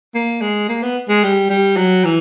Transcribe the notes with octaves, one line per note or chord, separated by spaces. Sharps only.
A#3
G#3
A#3
B3
G#3
G3
G3
F#3
E3